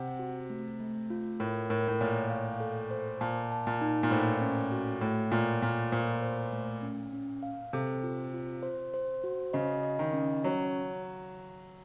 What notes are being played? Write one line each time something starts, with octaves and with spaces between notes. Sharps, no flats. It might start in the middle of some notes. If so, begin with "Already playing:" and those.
Already playing: C3 F#5
F#4
A3
A3
F4
A2 A#4
A2 A#4
A2
A#2 C#5
F5
A4
C5
A#2 A5
A5
A#2
D#4
A#2
A2 C5
C#4
F#4
A2 A3
A#2 F4
A#2 F4
A#2 C5
C5
A3
C#4
C#4
F5
C3 A4
F4
F4
C5
C5
F#4
C#3 D#5
D#5
D#3
C#4
F#3 C#5